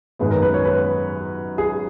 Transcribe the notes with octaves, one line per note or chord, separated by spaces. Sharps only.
F#2 D#3 G#3 B3 B4
A#4
B4
C#5
B4
G#4